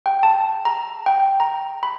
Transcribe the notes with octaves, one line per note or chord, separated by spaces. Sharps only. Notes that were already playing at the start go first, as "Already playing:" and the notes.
G5
A5
A#5
G5
A#5
B5